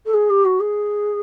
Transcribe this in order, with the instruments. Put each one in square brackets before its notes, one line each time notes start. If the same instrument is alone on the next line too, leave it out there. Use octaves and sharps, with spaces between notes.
[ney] A4
G#4
G4
F#4
G#4